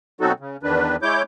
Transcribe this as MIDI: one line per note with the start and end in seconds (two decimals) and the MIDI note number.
0.21 0.32 47
0.21 0.32 54
0.21 0.32 60
0.21 0.32 63
0.21 0.32 66
0.21 0.32 69
0.40 0.57 49
0.63 0.96 40
0.63 0.96 51
0.63 0.96 62
0.63 0.96 71
1.02 1.22 56
1.02 1.22 64
1.02 1.22 73
1.02 1.22 86
1.02 1.22 91